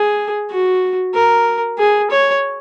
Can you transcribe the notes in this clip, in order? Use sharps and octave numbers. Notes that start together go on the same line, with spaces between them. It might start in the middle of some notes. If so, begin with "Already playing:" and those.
Already playing: G#4
F#4
A#4
G#4
C#5